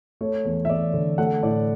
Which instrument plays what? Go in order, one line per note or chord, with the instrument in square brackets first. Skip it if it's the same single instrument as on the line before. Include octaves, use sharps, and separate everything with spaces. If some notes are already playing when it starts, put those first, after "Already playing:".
[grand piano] A3 C#5
E2
E5
E2 D5
D3
A3 F#5
A2 D5